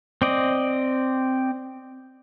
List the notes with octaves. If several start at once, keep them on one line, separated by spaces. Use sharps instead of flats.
C4 D5 D#5